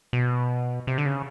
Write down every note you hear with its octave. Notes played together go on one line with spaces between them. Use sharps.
B2
C3
D3
C#3